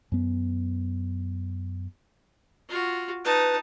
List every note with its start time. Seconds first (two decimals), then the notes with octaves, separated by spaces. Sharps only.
0.12 F#2 B3
2.69 F4 F#4
3.25 D#4 B4 A5